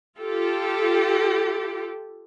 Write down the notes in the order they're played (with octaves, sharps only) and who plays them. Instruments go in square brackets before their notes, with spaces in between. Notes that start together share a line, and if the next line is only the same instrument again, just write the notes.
[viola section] F4 G4 A4